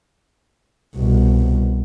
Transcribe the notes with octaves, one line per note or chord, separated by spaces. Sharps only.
C2 B2